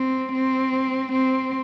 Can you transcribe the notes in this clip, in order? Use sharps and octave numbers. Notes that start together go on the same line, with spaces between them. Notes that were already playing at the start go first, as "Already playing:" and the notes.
Already playing: C4
C4
C4